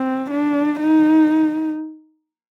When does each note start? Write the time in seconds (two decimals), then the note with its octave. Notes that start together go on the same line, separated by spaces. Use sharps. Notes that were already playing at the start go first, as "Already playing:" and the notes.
Already playing: C4
0.31 D4
0.80 D#4